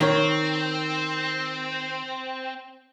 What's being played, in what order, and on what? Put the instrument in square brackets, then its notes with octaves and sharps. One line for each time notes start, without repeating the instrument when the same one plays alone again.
[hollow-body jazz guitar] D#3 C#5 [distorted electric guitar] C4